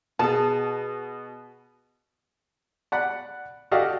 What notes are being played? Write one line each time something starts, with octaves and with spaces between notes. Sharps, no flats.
B2 G#4 A5
D5 F#5 B5
F#4 G4 A4 D5 D#5 F5